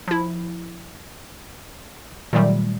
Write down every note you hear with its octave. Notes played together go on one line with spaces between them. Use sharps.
F3 E4
A#2 D#3 F#3 G3 A3